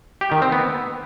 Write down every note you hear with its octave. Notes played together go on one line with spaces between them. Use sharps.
G4
D#3
C4
B3